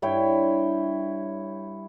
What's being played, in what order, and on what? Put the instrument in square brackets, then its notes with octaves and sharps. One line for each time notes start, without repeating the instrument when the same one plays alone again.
[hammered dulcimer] G2 E4 C#5 G5